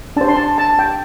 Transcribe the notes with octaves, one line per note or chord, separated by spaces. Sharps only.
D4 C5 A5
C6
A5
A5
G5